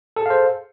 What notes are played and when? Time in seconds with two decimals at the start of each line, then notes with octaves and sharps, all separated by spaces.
0.16 A4
0.21 G#4
0.26 F5
0.30 C5